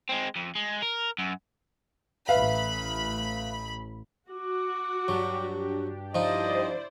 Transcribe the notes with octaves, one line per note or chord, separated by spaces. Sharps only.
G#3 C4
F2
G#3
A#4
F#2
A1 B4 E5 F5 B5
F#4 D6
G2 F#3 D4 G4
F3 D#4 E4 C5 D5 D#5